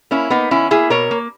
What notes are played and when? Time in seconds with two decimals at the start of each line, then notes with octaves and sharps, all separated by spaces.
0.11 A#3 C#4 E4
0.30 A#3 B3 D#4
0.51 D#3 C#4 E4
0.71 A#3 E4 G#4
0.90 B2 A#4 C#5
1.11 A#3